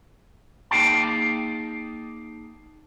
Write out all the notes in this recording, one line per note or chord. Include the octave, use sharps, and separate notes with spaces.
A#3 D#4 G#4 F5 G5 A5